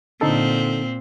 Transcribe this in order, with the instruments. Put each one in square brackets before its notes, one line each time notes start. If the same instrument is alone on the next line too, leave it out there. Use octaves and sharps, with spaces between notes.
[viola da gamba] A#2 C4 [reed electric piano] D3 D#4 A4